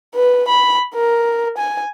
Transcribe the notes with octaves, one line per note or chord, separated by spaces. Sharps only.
B4
B5
A#4
G#5